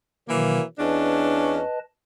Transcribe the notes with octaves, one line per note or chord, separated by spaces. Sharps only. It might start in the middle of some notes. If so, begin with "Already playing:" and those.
B2 D#3 E3 F#3 A#3
E2 C#4 D4 B4 D#5 A5